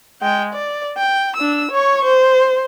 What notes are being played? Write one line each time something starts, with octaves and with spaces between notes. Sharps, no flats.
G#3 G5
D5
G5
D4 E6
C#5 C#6
C5